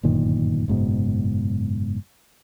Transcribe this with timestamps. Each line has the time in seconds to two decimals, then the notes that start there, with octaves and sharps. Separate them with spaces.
0.03 G1 F#2 A#2 D#3
0.68 F#1 G#2 B2